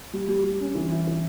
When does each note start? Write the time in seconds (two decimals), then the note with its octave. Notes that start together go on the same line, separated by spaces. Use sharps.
0.13 G3
0.29 G3
0.44 G3
0.61 C#4
0.75 E3
0.91 E4
1.07 E3